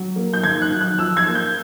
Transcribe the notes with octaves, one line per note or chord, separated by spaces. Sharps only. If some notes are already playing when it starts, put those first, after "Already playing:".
Already playing: F#3
A#3
G6
D#3 G#6
F#6
F#3
F#6
F3 E6
G#6
A#3
G6